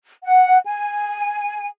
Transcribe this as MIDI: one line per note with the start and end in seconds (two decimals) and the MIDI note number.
0.24 0.58 78
0.66 1.67 80